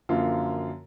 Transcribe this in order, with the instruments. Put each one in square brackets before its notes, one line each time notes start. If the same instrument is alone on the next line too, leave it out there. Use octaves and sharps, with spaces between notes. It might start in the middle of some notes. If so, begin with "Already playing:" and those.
[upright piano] F#2 D3 F3 A#3 F4